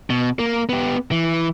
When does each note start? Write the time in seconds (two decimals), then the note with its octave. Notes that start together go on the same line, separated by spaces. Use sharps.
0.10 B2
0.39 A#3
0.69 B3 G4
1.12 E3